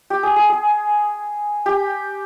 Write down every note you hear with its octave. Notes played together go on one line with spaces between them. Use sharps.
G4
G#4
G#4
G#4
G4